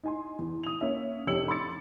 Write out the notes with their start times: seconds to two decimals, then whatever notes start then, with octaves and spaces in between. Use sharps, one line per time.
0.04 D#4 G#5 C6
0.39 E2
0.63 D#6 F7
0.81 A#3 C#4 E5
1.27 F1 C#4 G4 E6 C#7 F#7
1.48 B5 C6 D6 E6 A6 C#7